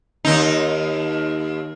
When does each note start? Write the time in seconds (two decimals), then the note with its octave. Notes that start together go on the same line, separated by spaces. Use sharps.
0.25 D#2 D#4